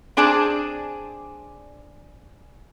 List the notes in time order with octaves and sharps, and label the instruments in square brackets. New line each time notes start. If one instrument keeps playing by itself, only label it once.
[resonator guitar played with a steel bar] C4 D4 G#4 D5 A5